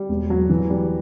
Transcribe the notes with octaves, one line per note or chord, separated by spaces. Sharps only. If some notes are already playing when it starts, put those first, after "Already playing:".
Already playing: G3
E1
F#3
E3
G3